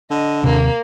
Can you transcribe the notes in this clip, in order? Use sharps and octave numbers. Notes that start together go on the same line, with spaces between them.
D3 D#5
D#2 C3 A#3